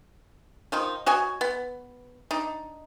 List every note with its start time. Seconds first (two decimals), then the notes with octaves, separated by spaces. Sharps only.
0.72 D#3 F3 D#4
1.06 F#4 C#5 D#5 G#5
1.41 B3
2.31 D4 D#4